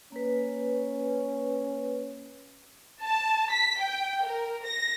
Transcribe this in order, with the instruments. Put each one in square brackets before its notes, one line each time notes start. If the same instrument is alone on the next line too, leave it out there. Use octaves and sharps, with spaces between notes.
[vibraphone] A#3 B4 [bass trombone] C#4
[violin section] A5
B6
G5
A#4
A#6